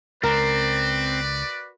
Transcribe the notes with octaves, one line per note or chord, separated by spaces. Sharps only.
C#2 C4 F#4 A#4 B4 D5